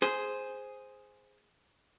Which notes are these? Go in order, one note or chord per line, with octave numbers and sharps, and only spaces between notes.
G#4 C5